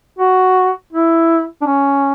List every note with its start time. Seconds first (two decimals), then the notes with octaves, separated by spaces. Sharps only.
0.19 F#4
0.93 E4
1.62 D4
1.66 C#4